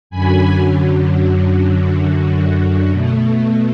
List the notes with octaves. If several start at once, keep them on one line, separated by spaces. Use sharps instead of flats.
F#2 D3 F#3 G#5 B5
B2 A3